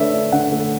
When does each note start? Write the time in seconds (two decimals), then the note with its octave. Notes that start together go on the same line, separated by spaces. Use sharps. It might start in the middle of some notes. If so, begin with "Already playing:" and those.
Already playing: D3 A3 D4 B4 C#5 D5 E5
0.14 D4
0.32 D3 F#5
0.52 A3